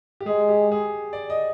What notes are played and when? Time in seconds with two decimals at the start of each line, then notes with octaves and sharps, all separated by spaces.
0.21 G4
0.26 G#3 G#4
0.49 G4
0.72 G#4
1.13 D5
1.30 D#5